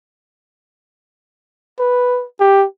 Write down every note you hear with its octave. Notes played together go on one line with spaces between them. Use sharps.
B4
G4